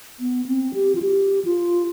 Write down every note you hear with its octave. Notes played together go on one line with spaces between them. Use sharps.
B3
C4
G4
F4
G4
F4